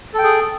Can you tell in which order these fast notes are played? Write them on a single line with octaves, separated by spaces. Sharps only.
A4 G5 G#4